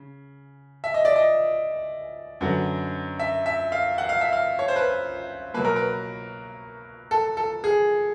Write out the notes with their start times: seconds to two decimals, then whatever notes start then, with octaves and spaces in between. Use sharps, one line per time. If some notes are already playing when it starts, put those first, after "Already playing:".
Already playing: C#3
0.84 E5
0.94 D#5
1.05 D5
1.16 D#5
2.41 F#2 D3 F#3 B3
3.19 E5
3.46 E5
3.72 F5
3.98 F#5
4.09 F5
4.21 E5
4.33 F5
4.59 C#5
4.68 C5
4.76 B4
5.54 B2 F#3 A#3 B4
5.65 A#4
5.76 B4
7.11 A4
7.37 A4
7.64 G#4